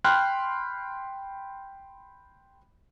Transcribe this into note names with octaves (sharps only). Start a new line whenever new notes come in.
G5 B5 C6 F6 F#6